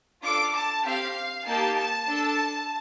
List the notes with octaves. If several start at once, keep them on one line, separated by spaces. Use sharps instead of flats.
D4 F4 A4 D6
A5
C4 G4 F5
A#3 D#4 G4 A5
A5
D4 A4